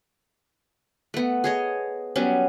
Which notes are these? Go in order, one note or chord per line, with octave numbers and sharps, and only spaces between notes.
A3 B3
G#4 C#5 D#5
F#3 G3 B3 C#4